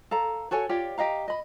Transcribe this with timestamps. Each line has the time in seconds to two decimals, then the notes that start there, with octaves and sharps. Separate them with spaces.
0.11 A4 F5 A#5
0.51 F#4 A4 C#5 G#5
0.69 F4 G4 C#5 D5
0.98 G4 D#5 F5 A#5
1.28 D#5 B5